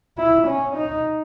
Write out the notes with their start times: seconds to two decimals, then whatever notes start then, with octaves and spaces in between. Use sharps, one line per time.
0.18 E4
0.47 C#4
0.76 D#4